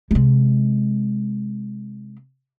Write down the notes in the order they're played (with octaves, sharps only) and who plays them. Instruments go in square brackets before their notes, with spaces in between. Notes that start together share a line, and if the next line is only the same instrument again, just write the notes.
[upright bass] C3 G#3